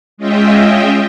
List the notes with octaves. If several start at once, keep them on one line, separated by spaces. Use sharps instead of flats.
G#3 C#4 F4 D#5 E5 G5